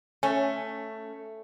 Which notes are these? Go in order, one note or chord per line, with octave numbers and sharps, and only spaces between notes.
A3 C#4